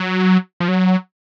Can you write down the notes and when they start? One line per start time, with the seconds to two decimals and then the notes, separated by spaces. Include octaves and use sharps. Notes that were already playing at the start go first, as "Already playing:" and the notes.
Already playing: F#3
0.60 F3
0.68 F#3